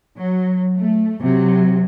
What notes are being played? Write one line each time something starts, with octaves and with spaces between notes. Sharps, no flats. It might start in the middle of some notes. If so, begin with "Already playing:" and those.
F#3
A3
C3 F#3